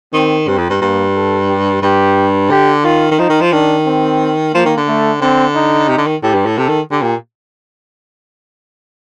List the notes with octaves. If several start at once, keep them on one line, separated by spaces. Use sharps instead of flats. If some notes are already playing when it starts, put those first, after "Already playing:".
D#3 C4
G2 C4
F2
G2
G2 A#3
A4
G4
G2 G4
D3 G4
D#3 F4
D#3
F3 D#4
D#3
F3
D#3 D4
C4
F3 A#3
D#3
D3
A3
D3 C4
D#4
C3
D3
D#3
A2 G4
G2
A2
C3 A4
D#3
D3 G4
A#2